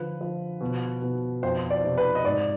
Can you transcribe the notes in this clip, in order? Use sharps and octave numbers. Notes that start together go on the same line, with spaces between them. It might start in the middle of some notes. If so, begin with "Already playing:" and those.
Already playing: D3 F3 B4
F3
B2
B2
F2 C5
D5
C3
B4
D#5
G#2 D5